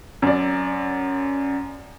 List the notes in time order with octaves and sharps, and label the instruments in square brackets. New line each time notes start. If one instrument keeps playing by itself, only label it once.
[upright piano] F#2 D5